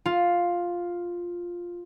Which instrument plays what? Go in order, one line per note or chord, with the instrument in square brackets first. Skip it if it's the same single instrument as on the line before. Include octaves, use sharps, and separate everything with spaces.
[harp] F4